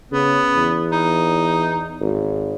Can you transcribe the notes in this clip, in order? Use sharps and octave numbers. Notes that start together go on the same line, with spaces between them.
C#3 B3
E2
D#4
G#1